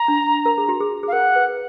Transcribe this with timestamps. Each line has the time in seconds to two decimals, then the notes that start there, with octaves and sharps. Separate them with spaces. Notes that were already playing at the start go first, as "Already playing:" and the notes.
Already playing: A#5
0.08 D4
0.46 A#4
0.58 G#4
0.69 F#4
0.80 G#4
1.03 G#4 F5
1.12 A#4 F#5
1.35 B4